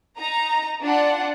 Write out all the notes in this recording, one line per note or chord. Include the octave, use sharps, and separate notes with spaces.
D#4 A#5
D4 F4 F#5